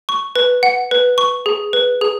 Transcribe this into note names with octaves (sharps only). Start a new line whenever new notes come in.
C#6
B4
F#5
B4
C#6
G#4
B4
G#4